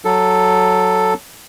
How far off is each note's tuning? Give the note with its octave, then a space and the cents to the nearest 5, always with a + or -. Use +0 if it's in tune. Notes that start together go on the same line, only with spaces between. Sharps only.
F#3 +0 A4 +0